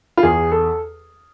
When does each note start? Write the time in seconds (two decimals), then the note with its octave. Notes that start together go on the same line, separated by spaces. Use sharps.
0.17 F4
0.23 E2 G#4
0.52 A4